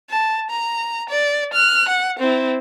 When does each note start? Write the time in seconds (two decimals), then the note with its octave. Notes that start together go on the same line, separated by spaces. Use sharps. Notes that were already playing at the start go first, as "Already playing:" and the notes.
0.10 A5
0.50 A#5
1.09 D5
1.54 F6 F#6
1.89 F#5
2.19 C4 E4